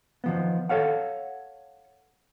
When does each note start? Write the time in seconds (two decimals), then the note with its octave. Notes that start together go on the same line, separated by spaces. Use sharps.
0.24 D#3 F3 B3
0.69 A4 C#5 F5 F#5